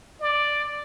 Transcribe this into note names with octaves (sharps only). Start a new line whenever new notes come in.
D5